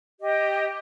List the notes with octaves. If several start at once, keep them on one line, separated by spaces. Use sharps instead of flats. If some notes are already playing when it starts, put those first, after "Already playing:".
G4 D#5